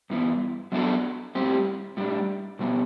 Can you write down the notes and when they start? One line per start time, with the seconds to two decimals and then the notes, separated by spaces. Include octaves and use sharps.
0.10 G2 E3 B3
0.72 F#3 B3 D4 F#4 A4
1.35 A2 G3 C4 G4
1.97 A2 G3 D4
2.59 B2 G3 B3